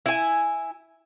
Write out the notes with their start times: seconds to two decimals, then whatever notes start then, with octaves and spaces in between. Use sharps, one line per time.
0.06 E4 G#5